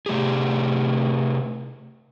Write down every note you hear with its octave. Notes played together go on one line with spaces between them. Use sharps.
C3 A3 G4 G#4